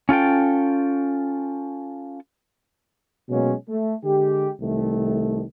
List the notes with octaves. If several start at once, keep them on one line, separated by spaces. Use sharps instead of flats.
C#4 F4 A4 G5
B2 F#3 G#3 A#3 C#4
A3
D3 G#3 G4
C2 D#3 A3